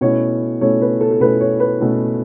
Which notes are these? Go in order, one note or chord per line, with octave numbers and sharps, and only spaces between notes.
B2 A3 C#4 E4 C#5
B2 A3 C#4 E4 C#5
B4
A4
A4
B2 A3 C#4 E4 B4
C#5
B4
B2 A3 C#4 E4